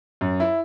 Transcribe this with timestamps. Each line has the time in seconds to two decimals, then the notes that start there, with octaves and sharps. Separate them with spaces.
0.21 F#2
0.40 E4